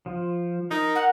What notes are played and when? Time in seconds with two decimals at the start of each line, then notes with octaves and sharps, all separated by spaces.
0.06 F3
0.71 D#4 A#4
0.95 F#5